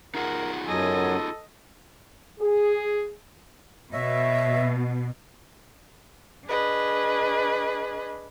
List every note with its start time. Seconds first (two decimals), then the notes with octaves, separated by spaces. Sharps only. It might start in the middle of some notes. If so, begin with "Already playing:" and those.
0.15 D#4 F4 G#4 A#4 F#5
0.67 F#2 F#3 A4 D#5 G#5
2.40 G#4
3.93 B2 C#5 D#5 E5
6.48 D4 G#4 B4 D#5